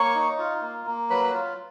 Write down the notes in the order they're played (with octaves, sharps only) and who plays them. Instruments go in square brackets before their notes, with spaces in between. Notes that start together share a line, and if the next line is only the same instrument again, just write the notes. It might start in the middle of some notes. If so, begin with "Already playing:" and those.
Already playing: [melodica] A#3 C#5 C#6
D#4
F4
A#3
A#3
F#3 B4 B5
F4